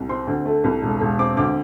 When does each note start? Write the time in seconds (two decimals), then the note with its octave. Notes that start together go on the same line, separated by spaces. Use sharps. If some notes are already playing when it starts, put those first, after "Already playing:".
Already playing: C2
0.09 C4 C6
0.27 D2
0.46 A3
0.64 C2
0.82 E1
1.01 E1
1.19 C4 D6
1.36 D2 D6